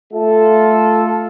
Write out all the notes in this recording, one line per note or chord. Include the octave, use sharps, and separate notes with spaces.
A3 F4 A4